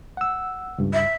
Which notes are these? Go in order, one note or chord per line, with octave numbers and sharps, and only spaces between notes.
F#5 E6
C#2 G2
E5